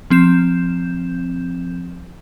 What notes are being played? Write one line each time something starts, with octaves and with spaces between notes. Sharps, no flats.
F3 C4 G6 E7